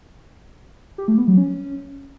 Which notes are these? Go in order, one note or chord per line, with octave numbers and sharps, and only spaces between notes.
G4
A3
B3
F#3
C#4